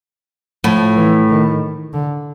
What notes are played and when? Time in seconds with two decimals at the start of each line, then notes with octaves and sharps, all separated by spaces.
0.64 A2 F3
0.97 E3
1.29 D#3
1.93 D3